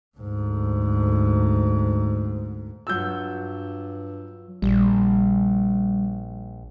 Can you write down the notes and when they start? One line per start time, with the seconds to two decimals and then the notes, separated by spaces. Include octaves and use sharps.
0.18 D2 G#2
2.87 G2 F#3 F4 E6 F#6 G6
4.62 A#1 G3